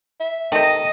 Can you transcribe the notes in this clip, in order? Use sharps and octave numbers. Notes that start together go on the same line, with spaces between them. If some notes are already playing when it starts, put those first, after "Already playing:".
E5
C3 D#3 A4 D#5